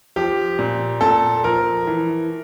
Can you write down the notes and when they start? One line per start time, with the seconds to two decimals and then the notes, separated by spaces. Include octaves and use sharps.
0.16 F3 G4
0.59 A#2
1.01 A#2 A4
1.44 F3 A#4
1.87 E3